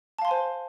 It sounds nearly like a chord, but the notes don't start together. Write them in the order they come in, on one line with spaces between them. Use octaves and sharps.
A5 F5 C6 G#5 C5